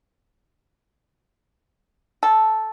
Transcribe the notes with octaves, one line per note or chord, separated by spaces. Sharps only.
A4